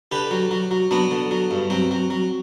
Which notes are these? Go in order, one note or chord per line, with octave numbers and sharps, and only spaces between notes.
D3 G4 B4
F#3
F#3
F#3
F#3 B3 D4
D3
F#3
G2
F#3 C4
F#3
F#3